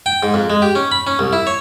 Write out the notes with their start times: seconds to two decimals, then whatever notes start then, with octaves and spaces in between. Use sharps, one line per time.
0.06 G5
0.23 G#2
0.34 F2
0.50 G#3
0.62 G4
0.75 C#4
0.92 B5
1.07 C#4
1.19 C2
1.33 E4
1.47 C#5